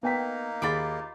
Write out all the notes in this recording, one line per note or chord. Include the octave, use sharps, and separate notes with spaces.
A#3 B3 D#4 G5 B6
D#2 F4 G#4 B5 D6 A6